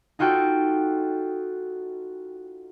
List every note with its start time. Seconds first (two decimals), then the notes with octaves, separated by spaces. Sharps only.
0.19 D#4 F4 F#4 A4 G5